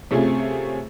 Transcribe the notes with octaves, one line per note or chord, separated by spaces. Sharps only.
C3 A3 C4 C#4 F4 G#4